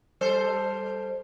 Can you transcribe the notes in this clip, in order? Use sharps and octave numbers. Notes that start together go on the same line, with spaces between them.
G3 A4 C5